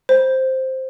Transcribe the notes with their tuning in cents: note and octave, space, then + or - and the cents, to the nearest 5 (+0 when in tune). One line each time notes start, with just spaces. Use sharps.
C5 +5